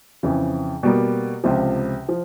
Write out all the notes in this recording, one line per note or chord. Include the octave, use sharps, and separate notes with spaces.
F2 C#3 E3
B2 G3 A#3
C#2 C3 F3
F3